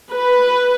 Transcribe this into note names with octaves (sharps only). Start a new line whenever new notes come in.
B4